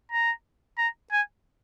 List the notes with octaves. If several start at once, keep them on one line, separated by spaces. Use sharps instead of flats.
A#5
A#5
G#5